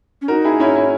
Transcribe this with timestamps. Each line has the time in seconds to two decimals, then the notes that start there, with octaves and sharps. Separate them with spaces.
0.22 C#4
0.28 D#4 F#4 A#4
0.44 E4 G#4
0.60 C#4 E4
0.75 C#4 E4